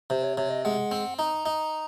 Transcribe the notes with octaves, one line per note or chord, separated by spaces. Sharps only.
C3 C5
C#5
C3 C#5
D#5
G#3 F#5
C4
D#4 A#5
D#4